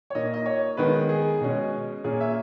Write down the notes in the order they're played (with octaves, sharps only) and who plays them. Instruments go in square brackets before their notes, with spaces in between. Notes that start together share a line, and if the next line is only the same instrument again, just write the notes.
[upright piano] C#5
A#2 A#3 D#4 D#5
D#5
C#5
D#3 G#3 B3 B4
G#4
B2 G#3 C#4
A#2 A#3 C#4 G#4
E5